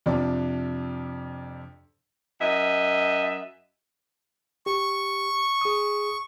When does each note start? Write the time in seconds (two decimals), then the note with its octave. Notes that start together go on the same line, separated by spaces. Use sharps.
0.06 F2 C3 D4 F4 D5
2.41 F#2 D#5 E5
4.66 G4 C#6
5.61 G#4 D#6